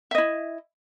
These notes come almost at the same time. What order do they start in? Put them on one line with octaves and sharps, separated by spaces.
E5 D#5 E4